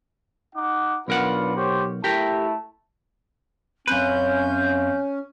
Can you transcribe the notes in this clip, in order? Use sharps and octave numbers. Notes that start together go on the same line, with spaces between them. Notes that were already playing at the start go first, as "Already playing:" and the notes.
D#4 F#5 D6
B1 D4 F4 A#4 B4 F#5
G4 C5 C#5
A3 E4 G4 A#4 A5
F#2 C4 C#4 B4 F5 G6